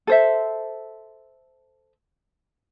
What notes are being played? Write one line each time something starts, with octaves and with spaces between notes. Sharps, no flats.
A4 C5 E5